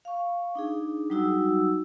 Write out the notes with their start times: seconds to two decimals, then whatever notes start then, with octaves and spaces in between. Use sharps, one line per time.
0.05 F5 C#6
0.55 D4 D#4 G#4
1.10 F#3 G3 D#4 F#4 E6